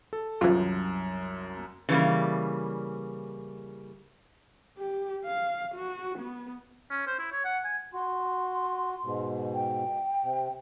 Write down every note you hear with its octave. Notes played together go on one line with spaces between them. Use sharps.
A4
C2 F#2 E3 F4
C#3 E3 G3 A#3
G4
F5
F#4
B3
C#4
C5
E4
C#5
F#5
G#5
F#4 C6
G#2 B2
G5
C3